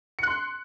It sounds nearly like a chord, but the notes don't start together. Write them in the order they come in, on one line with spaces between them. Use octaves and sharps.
C#7 F#6 C6